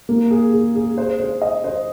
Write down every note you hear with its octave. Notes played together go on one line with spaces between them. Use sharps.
A#3
G#4
G#4
G#4
C5
C5
D#5
C5